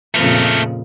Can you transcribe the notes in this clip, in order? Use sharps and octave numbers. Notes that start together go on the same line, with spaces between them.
F2 A#2 C#3 A3 A#4